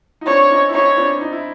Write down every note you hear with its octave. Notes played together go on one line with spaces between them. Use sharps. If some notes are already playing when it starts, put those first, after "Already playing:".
D#4
C4 D4 C#5
C#4 D#4
E4
C#4 D#4 C#5
C4 D4
D#4
E4